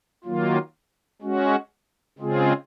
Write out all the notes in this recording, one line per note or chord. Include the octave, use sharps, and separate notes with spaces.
D#3 F#3 A#3 F4
G#3 C#4 F#4
C#3 G#3 C4 F4 G#4